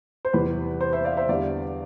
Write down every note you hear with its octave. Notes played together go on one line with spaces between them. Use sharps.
C5
E2 C3 E3 G3 B4
C5
C5 E5
D5 F5
C5 E5
E2 D3 G3 D5 F5